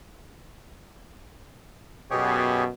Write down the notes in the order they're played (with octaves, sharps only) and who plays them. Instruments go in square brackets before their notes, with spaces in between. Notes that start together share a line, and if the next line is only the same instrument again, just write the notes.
[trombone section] F#2 B2 [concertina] G4 G#4 C#5